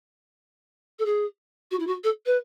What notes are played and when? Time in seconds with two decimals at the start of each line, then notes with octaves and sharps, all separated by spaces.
0.99 A4
1.05 G#4
1.71 F#4
1.79 E4
1.87 F#4
2.03 A4
2.26 B4